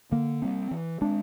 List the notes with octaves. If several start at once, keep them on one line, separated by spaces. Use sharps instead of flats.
D3 A#3
G3 C4
E3
G#3 C4 D4